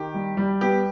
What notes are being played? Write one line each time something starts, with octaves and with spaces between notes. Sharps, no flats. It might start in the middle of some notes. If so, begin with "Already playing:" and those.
Already playing: D#3 G4
G3
G3
B3 G4